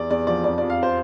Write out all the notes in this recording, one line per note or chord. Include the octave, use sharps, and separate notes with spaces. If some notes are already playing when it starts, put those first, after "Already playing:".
Already playing: E2 D5
E2 D5
F3 D5
F2 D5
F2 D5
F5
C5